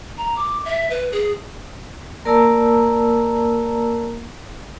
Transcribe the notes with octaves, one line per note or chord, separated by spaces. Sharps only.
A#5
D6
E5
B4
G#4
A#3 A#4 D5 A5 A#5 E6